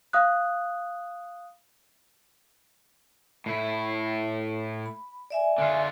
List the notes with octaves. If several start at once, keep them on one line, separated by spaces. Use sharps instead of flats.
F5 D#6 F#6
A2 E4
B5
D5 E5 G#5
D3 F4